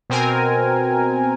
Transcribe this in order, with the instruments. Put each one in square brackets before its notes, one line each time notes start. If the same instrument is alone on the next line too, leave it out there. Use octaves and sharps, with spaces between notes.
[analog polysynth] B2 C4 A#4 G#5